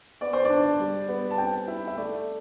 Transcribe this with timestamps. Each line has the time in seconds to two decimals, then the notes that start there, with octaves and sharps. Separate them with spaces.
0.21 B3 D5
0.33 C5
0.45 D4 D5
0.79 G3
1.09 B3
1.30 A5
1.38 C4 G5
1.67 E4 E5
1.87 E5
1.97 A3 D5